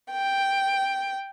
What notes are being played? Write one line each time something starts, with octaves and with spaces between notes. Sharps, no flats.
G5